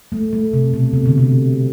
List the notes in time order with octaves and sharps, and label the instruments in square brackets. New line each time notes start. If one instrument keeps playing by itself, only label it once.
[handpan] A3
A3
C3
B2
C3
D3
C3